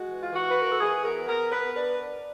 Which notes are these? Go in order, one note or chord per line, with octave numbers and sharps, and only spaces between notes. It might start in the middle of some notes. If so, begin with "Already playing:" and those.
Already playing: G#3 F#4
E3
F4
E3 F#4
B4
E3 A#4
A4
E3 G#4
B3 A#4
B3 A#4
B3 B4
D4 B4